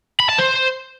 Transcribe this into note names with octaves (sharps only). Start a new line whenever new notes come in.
B5
A5
C5